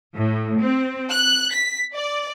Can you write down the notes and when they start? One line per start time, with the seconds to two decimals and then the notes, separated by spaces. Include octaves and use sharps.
0.16 A2
0.61 C4
1.11 F#6
1.53 B6
1.95 D5